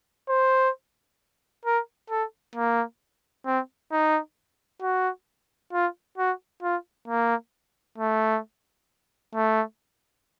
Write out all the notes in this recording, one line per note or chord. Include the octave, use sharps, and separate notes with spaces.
C5
A#4
A4
A#3
C4
D#4
F#4
F4
F#4
F4
A#3
A3
A3